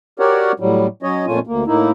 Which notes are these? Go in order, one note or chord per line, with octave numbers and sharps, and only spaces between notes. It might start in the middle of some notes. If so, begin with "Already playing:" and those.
F#4 G4 A#4 C#5 D5 F#5
A2 F#3 G3
F#3 C#4 C#5 D#5
F2 A#2 A3 C#4 F4 G#5
D2 A#3
A2 A#3 D#4 E4